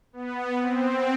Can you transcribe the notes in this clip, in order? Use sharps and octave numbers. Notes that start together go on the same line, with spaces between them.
B3
C4